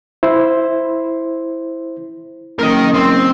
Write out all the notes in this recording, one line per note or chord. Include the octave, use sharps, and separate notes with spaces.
E4 C5
F#1 A#4 D#5
C4